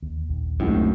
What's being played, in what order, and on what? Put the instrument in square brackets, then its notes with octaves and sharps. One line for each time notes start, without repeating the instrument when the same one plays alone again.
[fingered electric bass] D#2
A#1 D#2 D#3
[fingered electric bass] D1 C#2 C4 [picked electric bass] F#2 [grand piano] A2 D#3 G#3